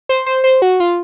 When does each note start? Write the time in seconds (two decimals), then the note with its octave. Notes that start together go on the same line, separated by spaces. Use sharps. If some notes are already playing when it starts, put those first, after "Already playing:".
0.09 C5
0.26 C5
0.44 C5
0.62 F#4
0.80 F4